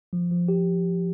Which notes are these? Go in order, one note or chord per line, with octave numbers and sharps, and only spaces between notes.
F3
F3
G4